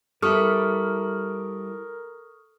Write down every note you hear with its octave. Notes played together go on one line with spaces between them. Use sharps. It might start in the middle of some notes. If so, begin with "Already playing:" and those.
G3 E4 A4 A#4 C#6 D#6 F6